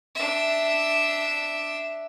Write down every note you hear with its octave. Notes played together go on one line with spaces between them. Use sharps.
D4 E5